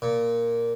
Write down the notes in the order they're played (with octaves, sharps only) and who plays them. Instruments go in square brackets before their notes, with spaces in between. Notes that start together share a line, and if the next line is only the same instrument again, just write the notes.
[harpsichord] A#2